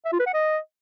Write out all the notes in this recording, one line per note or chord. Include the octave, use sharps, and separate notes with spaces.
E5
F4
B4
F#5
D#5